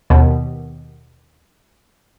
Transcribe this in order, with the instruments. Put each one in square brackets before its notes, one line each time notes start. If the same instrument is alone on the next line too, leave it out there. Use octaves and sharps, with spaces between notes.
[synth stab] D#2 B2